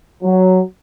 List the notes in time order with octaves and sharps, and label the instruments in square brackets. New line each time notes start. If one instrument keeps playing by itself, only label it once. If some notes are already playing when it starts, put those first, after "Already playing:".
[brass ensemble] F#3